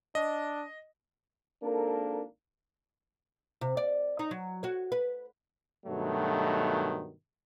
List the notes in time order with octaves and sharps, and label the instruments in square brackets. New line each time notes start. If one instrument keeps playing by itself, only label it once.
[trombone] D4 [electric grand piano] D#5
[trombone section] G#1 A#3 D4 A4 A#4
[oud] C3
D5
D#4
F#3
F#4 C#5
B4
[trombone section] G2 B2 D#3 F#3 A3